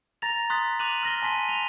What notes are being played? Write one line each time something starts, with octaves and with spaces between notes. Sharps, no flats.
A#5 A6 A#6 F7
C6 D#6 F#6 A6 B6
D6 F#6 D#7 F7 F#7
F6 A#6 G7
G#5 A5 C6 B6 D#7
D#7 F7 G7